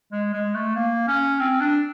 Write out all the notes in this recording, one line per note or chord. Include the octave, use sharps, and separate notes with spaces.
G#3
G#3
A3
A#3
C#4
C4
D4